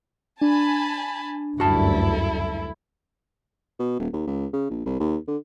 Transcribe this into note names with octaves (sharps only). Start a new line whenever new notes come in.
D4 G#5 A5 B5
F#1 D2 G2 E4 F#4 A4 A5
B2
D#1
D#2
C#2
C#3
A#1
C2
D#2
D3